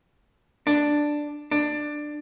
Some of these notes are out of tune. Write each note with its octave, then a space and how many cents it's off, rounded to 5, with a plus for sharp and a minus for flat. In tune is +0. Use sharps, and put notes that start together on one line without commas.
D4 +5
D4 +15